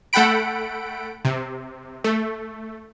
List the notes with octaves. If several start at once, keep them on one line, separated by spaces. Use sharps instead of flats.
A3 A4 F#5 G5 B5 D7
C3
A3